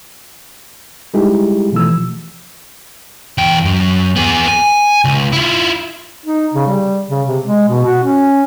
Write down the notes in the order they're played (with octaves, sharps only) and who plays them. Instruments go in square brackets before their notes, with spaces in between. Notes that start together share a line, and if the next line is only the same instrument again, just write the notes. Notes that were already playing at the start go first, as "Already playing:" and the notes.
[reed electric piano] G3 G#3 D#4 E4 G4 G#4
B2 E3 F3 A3 E6
[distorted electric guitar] E2 G5
F#2
B3 G#4
G#5
C#2
E4 F4
[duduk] D#4
C#3
G3
C#3
C3
G#3
B2
F#4
C#4